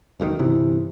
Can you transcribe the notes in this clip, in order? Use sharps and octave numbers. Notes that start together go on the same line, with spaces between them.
E1 B1 B2 D#3
G1 C3 E3